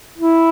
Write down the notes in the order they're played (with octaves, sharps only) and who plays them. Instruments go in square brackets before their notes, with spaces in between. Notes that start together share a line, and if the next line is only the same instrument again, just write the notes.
[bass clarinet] E4